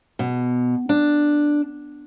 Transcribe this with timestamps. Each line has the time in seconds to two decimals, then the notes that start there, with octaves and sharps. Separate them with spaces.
0.19 B2
0.89 D4